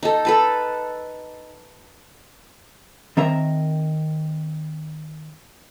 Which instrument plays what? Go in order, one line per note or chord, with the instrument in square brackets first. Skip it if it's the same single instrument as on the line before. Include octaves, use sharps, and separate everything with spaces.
[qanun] D#4 A4
A4 B4 A5
[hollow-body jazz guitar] D#3 C4 A#4 E5 A#5